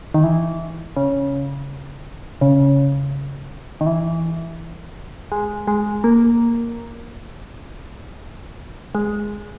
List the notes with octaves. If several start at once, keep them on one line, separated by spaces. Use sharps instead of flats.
D#3
E3
C#3
C#3
D#3
E3
G#3
G#3
A#3
G#3